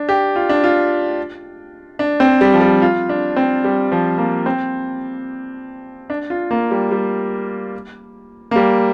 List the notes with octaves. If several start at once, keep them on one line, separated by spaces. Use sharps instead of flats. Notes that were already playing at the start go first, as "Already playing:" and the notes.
Already playing: D4
G4
F4
D4
F4
D4
C4
G3
F3
G3
F4
D4
C4
G3
F3
A#3
C4
D4
F4
A#3
G3
G3
A#3
G3